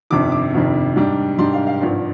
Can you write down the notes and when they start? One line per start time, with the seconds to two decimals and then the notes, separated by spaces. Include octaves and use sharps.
0.10 G1 F2 C3 D#3 D6
0.32 D6
0.54 G1 F2 C3 D#3
0.96 G#2 G3 D4
1.38 G#2 G3 D4 C6
1.53 F5
1.67 F5
1.82 G#1 G2 F3